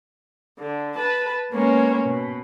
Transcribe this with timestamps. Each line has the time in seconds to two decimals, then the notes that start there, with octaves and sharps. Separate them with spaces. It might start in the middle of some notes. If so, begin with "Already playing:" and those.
0.59 D3
0.95 B4 A5
1.52 G#3 A#3 B3 C#4
2.05 B2